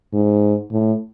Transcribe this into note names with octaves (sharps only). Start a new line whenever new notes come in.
G#2
A2